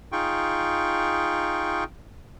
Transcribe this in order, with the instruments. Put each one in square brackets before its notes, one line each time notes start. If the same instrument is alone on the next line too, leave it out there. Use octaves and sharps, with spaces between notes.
[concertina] D#4 F4 G#4 G5 C#6